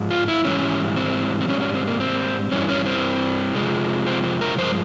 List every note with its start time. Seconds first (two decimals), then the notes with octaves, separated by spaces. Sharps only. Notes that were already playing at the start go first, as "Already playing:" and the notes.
Already playing: G#2 F3 G#3
0.11 F4
0.28 E4
0.45 G#2 E3 G3 C#4
0.96 C4
1.41 C4
1.48 G#2 G3 C#4
1.61 C#4
1.74 C4
1.87 A#3
2.00 C4
2.51 G2 E3 G3 C#4
2.69 C#4
2.86 C4
3.55 F2 C3 F3 G#3
4.07 C4
4.24 C4
4.41 A#4
4.58 G2 F3 G#3 C5